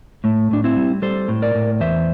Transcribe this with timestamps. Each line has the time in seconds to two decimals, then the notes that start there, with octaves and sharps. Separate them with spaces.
0.24 A2 A3
0.51 A2 D4
0.64 C4 E4
0.76 G3
1.02 G3 A4 C5
1.28 A2
1.42 A#4 D5
1.55 A2
1.80 E2 C5 E5